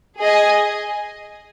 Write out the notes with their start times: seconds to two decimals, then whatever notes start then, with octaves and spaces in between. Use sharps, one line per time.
0.19 G#4 D#5 G#5